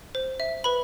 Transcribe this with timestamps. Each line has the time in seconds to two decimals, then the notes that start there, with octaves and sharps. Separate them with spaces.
0.15 C5
0.40 E5
0.64 B4 B5